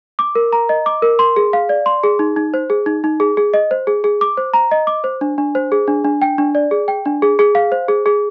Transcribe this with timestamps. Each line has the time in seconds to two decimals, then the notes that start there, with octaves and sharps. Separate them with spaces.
0.19 D6
0.35 A#4
0.53 A#5
0.69 D#5
0.86 D6
1.02 A#4
1.19 C6
1.36 G#4
1.53 F5
1.69 D5
1.86 C6
2.04 G#4
2.19 D#4
2.36 D#4
2.54 C5
2.70 G#4
2.86 D#4
3.04 D#4
3.20 G#4
3.37 G#4
3.54 D#5
3.71 C5
3.87 G#4
4.04 G#4
4.21 D6
4.37 C5
4.54 A#5
4.71 D#5
4.87 D6
5.04 C5
5.21 D4
5.38 D4
5.55 C5
5.72 G#4
5.88 D4
6.04 D4
6.22 G5
6.38 D4
6.55 D5
6.71 G#4
6.88 G5
7.06 D4
7.22 G#4
7.39 G#4
7.55 F5
7.72 C5
7.88 G#4
8.06 G#4